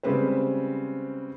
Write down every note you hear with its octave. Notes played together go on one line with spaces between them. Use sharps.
C#3 G3 G#3 C4 B4 C5